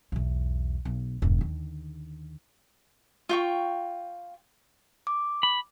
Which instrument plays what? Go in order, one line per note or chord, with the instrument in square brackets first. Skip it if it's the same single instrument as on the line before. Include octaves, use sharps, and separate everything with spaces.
[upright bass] B1 E2
B1
E1 G2
D#2 D3
[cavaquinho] F4 G5 C#6
[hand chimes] D6
[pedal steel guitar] B5